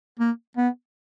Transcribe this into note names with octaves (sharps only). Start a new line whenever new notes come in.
A#3
B3